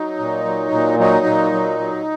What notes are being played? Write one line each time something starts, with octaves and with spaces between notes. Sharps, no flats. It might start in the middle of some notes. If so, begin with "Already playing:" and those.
Already playing: F#3 D#4
A#2
F#3
A#2
F#3 D#4
A#2
F#3
F#3